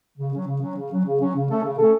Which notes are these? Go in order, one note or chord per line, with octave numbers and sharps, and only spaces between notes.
C#3
F#3 C#4
C#3
F#3 C#4
C#3
F#3 C#4
C#3
F#3 C#4
C#3
A3 C#4 A4
C#3
A3 C#4 A4